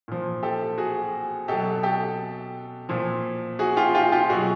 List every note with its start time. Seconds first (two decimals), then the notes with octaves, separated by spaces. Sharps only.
0.08 A#2 F3
0.43 G4 A4
0.78 F#4 G#4
1.48 B2 F#3 G4 A4
1.83 G4 A4
2.89 A#2 F3
3.59 F#4 G#4
3.77 F4 G4
3.95 F4 G4
4.12 F4 G4
4.30 B2 F#3 F#4 G#4